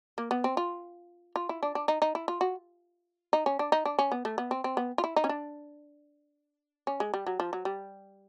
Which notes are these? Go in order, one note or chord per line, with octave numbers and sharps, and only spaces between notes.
A#3
B3
C4
F4
F4
E4
D4
D4
D#4
D#4
E4
F4
F#4
D#4
C#4
D4
D#4
D4
C#4
B3
A3
B3
C4
C4
B3
F4
E4
D#4
C#4
D4
C#4
G#3
G3
F#3
F3
F#3
G3